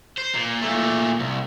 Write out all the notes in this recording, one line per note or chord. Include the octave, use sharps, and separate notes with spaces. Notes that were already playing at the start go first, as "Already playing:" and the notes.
C5
A#2
A#2 A3
C2